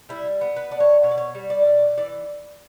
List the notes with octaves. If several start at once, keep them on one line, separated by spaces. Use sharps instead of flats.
G3 E4
B3
B4
D4 D5
C#5
B2 C#5
D5
C#5
G3
D5
B2
E3 D5